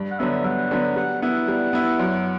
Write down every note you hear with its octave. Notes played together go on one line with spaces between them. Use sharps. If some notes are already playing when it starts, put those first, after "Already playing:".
Already playing: G2
F#5
D3 F#3 B3 E5
G2 F#5
D3 F#3 B3
G3 F#5
B3 E4 F#5
G3
B3 E4
F#2